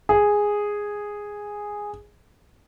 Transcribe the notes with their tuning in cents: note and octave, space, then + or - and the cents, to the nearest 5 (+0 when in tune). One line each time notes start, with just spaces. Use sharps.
G#4 -5